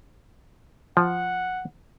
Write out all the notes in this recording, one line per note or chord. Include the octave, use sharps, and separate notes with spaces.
F3 F#5